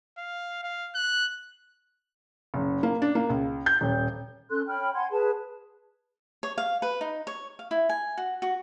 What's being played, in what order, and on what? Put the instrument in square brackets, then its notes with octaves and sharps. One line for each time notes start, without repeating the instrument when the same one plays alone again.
[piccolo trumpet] F5
F5
F#6
[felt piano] F#1
A#3
D4
A#3
C#2
G6
D#1
[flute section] C#4 A4 C6 F#6
C#5 G5 B5 F6
F#5 G#5 C6 G#6
G#4 B4 A5
[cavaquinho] C#5
F5
B4
D#4
C#5
F5
E4
G#5
F#4
F#4